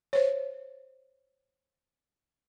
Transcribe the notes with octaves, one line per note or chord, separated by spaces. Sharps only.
C5 C#5